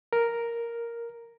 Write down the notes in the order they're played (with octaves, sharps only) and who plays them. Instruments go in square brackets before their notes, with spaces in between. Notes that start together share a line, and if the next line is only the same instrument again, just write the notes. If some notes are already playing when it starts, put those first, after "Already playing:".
[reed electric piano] A#4